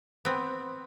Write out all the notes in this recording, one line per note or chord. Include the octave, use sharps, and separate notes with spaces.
B3 C4